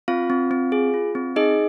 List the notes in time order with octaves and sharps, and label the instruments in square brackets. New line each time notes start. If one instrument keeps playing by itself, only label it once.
[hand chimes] C4 F4 F5
C4
C4
G#4
F4
C4
D#4 G#4 D#5